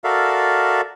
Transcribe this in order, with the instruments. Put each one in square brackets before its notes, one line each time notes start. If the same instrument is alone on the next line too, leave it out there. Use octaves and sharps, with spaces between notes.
[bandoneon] F#4 A4 A#4 D5 E5 F5